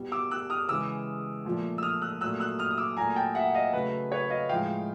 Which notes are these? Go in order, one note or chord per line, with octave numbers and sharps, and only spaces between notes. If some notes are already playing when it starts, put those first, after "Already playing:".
Already playing: B2 G3
D6 E6
E6 F#6
D#6 F6
C#3 E3 G#3 D6 E6
A#2 F3 A3
E6
D#6 F6
E6 F#6
A#2 F#3 A3 E6 F#6
E6 F#6
D#6 F6
D#6
D6 E6
A#2 F#3 A3 G#5 A#5
G5 A5
E5 F#5
D#5 F5
C#3 F#3 A3 B4
B4 C#5
D#5 F5
A2 F3 G#3 F5 G5